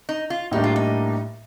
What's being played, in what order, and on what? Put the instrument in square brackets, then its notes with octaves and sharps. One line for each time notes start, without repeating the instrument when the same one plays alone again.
[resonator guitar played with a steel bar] D#4
F4
[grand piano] A2 G3 A#3 D4 [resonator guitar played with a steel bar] D#4
[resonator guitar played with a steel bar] F4
D#4